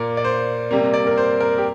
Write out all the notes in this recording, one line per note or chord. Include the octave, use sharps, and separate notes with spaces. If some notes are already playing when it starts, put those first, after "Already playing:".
Already playing: A#2 A#3 D5
D5
C5
C3 G3 A#3
D5
A#4
C5
A#4
G4